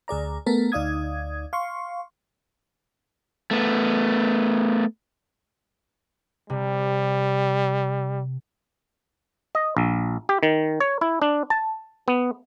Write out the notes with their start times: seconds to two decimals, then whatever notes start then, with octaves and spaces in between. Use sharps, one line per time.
0.08 D2 G#4 D5 A#5
0.46 A3 B3 A4 A#4
0.72 D2 D#4 D5 F5 D#6 G#6
1.53 F5 C6 C#6
3.51 A3 B3
6.50 C3 G3
9.55 D#5
9.77 A#1
10.29 G4
10.43 D#3
10.80 C#5
11.01 E4
11.22 D4
11.50 A5
12.08 B3